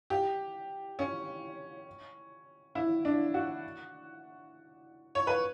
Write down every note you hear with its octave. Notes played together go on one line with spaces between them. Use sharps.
G4
C#4
E4
D4
F#4
C#5
B4